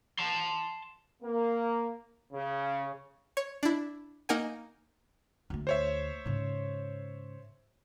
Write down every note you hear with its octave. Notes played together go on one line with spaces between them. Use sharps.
A5 C6
A#3
C#3
C#5
D4 E4
A#3 D#4 A#4 F#5 G#5
D2 A3
C5 C#5 E5
G#2 C#3